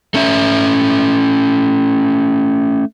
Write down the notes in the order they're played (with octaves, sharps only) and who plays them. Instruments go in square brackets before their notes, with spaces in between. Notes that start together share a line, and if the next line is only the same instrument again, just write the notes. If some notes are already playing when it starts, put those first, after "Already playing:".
[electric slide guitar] A3 C#4 E5